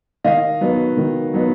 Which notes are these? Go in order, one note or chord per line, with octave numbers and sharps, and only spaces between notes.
D#3 D#5 F5
F#3 B3 D#4
D#3
F#3 B3 D#4